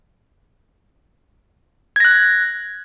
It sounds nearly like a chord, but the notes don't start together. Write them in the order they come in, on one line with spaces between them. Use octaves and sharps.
G#6 A#6 F#6